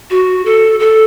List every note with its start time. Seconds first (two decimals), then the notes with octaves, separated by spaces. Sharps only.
0.10 F#4
0.45 A4
0.80 A4